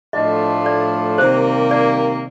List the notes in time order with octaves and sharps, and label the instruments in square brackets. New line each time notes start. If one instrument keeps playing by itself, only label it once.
[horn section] A2 F3 A3 D4 F4 [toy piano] D#5
[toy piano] D5
[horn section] C3 D#3 G3 A#3 [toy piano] C5
[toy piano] D5